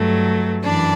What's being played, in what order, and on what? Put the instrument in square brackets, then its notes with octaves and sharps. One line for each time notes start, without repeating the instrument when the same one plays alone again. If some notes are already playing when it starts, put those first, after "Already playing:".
Already playing: [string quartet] G2 F#3 A3
F#2 E3 D4 D5